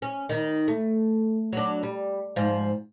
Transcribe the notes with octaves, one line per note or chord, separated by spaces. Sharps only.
C#4
D#3 D#4
A3
F#3 D4
G3
G#2 F3